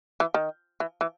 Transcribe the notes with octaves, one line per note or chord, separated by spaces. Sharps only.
E3
D#3
E3
E3